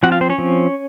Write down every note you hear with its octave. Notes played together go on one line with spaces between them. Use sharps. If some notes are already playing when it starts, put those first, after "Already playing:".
F3 C4 F#4 F#5
F4 F5
C4 C5
C#4 C#5
F3 C4